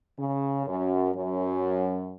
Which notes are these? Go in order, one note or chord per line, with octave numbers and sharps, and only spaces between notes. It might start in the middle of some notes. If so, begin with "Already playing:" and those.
C#3
F#2
F#2